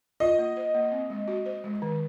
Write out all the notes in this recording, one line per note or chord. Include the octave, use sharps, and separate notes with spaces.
F4 D#5
A#3
C5
A#3
C4
G#3
F#4
C5
G#3
D#3